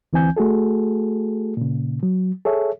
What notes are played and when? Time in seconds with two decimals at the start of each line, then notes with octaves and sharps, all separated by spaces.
0.13 D2 E3 C4 G#5 G6
0.37 A3 F#4 G#4 A4
1.57 A#2 C#3
2.03 F#3
2.45 G#4 A4 C#5 E5